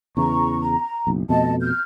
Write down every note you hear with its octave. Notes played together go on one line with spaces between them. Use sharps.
E2 C#3 E3 A#5 C#6
A#5
F#1 B1
F2 B2 A3 D#5 A5
F6 G6